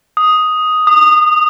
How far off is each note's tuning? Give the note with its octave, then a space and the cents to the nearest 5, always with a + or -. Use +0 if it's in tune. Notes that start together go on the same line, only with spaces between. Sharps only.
D#6 +5
D#6 -25